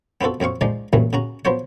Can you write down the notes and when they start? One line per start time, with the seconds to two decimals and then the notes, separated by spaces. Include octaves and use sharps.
0.21 B3 C4 F4 F#4 A4
0.40 F2 F#3 C4 F5 C#6
0.61 F3 G#3 D#4 D5
0.93 C2 F#2 A#2 E3 F#3 A3
1.13 C#3 F#4 A#5
1.45 F3 F#3 B3 C5 C#5